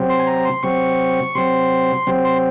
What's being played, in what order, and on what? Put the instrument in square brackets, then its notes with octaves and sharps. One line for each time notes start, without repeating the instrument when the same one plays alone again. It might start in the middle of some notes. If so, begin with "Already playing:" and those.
Already playing: [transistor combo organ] C3 F#3 C4
C6
G#5
A#5
C6
C3 F#3 C4 C#6
C3 F#3 C4 C6
C3 F#3 C4
C6